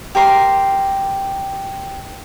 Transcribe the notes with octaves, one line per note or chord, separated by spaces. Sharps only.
G4 A#4 C6